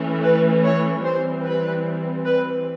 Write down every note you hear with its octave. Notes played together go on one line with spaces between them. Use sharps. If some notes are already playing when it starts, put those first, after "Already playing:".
Already playing: E3 A3 C#4
B4
C#5
E3 G3 C4 C5
B4
B4